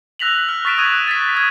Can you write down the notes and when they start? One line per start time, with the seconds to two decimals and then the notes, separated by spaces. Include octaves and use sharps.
0.19 E6 F#6 A#6 B6 F7 F#7
0.49 F6
0.65 C#6 A6 B6 D7 E7
0.78 D#6 F#6 G#6 D#7
1.08 A6 B6
1.35 D#6 G#6